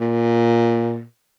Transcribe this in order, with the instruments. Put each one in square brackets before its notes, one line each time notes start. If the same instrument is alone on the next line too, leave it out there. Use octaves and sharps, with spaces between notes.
[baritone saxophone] A#2